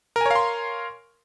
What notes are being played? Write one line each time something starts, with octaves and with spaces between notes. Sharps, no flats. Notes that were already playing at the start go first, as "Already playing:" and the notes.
A#4 C#5 F5 G#5 C6